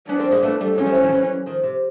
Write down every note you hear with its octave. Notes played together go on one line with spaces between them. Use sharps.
B3 C#4 D4
A#3 C4
G#3 A#3
A3 B3
G3 A3
F#3 G#3 C#4
F3 G3
E3 F#3
D#3 F3
E3 F#3
D#3 F3
C3